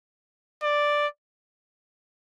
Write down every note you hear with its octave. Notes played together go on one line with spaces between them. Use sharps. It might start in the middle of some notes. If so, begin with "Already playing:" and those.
D5